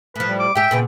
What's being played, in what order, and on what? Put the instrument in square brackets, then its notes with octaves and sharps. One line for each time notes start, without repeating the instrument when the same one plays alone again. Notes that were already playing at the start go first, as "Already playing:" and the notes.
[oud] A2 F3 [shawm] B4
[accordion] G3
[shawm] D6
[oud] G#2 G4 [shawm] E5 [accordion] G5
[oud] A#2 C#3 B3